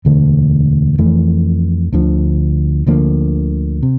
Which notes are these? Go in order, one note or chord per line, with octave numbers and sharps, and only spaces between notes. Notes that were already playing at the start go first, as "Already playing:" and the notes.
E1 D2 D3 A3
F2 E3 A3
D2 D3 F3
D2 D3 F3 A#3
C3